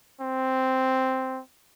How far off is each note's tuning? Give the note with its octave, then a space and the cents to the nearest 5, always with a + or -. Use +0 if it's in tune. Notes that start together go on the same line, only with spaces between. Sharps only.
C4 +0